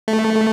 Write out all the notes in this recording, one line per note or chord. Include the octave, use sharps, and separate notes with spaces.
A3